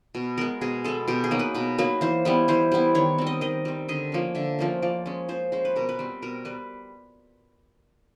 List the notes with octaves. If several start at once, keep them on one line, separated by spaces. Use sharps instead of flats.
B2
G#3 B3 A#4
B2 G#4
G#3 B3 A4
B2 G4
G#4
F#3 A#3 D#4
B4
B2 B4
F#3 A#3 D#4 B4
E3 C5
G3 B3 E4
E3 C5
G3 B3 E4
D#3 C#5
G3 C4
D#5
D#3 D#5
G3 C4
D3 D#5
F3 A#3 C#4
D3 E5
F3 A#3 C#4
F3 D5
G#3 C#4
F3 C5
G#3 C#4 C5
B4
B2 A#4
B4
G3 C4
B2 A#4
G3 B4